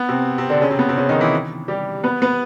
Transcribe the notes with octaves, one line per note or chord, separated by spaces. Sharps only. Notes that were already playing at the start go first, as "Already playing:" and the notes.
Already playing: B3
C3 C4
C3 C4
D3 D4
C#3 C#4
C3 C4
B3
C3 C4
C#3 C#4
D#3 D#4
E3 E4
G3 G4
B3 B4
B3 B4